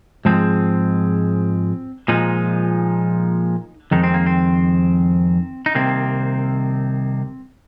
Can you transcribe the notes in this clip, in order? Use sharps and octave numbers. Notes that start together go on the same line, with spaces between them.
G#2 F3 G#3 C4
A#2 F3 G#3 D#4
F2 D#3 G#3 D#4
C4
A#3
C4
D#4
C2 C3 D#3 A#3 C4